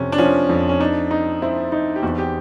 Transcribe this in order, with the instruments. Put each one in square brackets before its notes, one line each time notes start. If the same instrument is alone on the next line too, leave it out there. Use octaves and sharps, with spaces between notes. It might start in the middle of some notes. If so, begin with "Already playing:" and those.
Already playing: [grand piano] F2 C3 [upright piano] C#4
[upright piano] D4
[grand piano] F3 [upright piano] C#4
[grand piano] F2
[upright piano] C#4
[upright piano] D4 [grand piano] D#4
[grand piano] D#4
[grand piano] C4 [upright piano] E4
[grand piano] D#4
[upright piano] G4
[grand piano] E2 [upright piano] F#4
[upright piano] G4